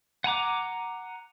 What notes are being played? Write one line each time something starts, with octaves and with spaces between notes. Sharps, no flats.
F#5 G#5 A#5 D6